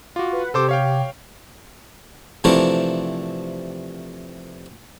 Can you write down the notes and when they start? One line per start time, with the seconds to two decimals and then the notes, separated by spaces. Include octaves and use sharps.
0.16 F4 F#4 D6
0.32 B4 F#5
0.54 C3 G4 A4 C5 D6
0.69 C#5 F5 G5
2.44 C3 E3 F3 A3 D4 A#4